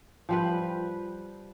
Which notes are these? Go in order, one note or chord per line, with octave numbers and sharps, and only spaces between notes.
F3 G3 B4